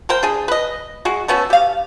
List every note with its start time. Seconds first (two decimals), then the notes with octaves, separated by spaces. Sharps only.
0.09 A#4 C5 G5
0.23 D4 G#4
0.48 B4 D#5
1.05 G#3 F#4
1.28 A3 B3 C#4 F#4
1.50 G4 F5